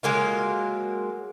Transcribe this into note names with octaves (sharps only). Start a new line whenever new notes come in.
F#3 G#3 A#3 F4